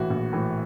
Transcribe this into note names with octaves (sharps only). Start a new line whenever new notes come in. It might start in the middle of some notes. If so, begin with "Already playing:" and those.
Already playing: A#1 A2 E3 F#4
A#1
A2 E3